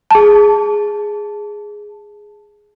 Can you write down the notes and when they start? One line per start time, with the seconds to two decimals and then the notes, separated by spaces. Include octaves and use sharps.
0.11 G#4 A5